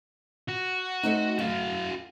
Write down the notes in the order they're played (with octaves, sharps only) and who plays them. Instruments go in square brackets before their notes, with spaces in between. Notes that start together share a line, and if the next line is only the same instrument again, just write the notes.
[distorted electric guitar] F#4
[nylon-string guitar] A3 C4 D#4
[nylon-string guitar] F#2 [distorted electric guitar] F#4 F5